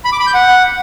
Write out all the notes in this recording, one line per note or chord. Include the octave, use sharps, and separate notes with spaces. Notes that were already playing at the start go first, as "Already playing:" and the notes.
B5
D6
B5
G6
F#5